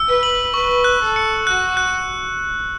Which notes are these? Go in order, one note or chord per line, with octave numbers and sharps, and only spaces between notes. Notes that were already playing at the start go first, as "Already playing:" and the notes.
Already playing: E6
B4
F#7
B4 C#6
F#6
A4
C#7
F#4 F#6
F#6